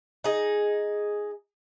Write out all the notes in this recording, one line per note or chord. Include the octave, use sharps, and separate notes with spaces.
D#4 G#4